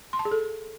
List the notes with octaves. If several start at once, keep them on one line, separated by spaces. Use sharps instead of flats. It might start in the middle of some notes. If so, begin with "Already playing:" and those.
C6
A5
G#4
A4